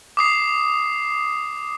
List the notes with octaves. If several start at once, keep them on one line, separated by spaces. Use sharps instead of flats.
D6 D#6 C7